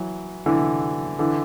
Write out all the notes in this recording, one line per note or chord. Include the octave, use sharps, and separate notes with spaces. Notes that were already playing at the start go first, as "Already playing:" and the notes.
Already playing: E3 F#3
D3 E3
D3 E3